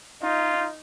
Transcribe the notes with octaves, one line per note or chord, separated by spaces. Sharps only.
D#4 F4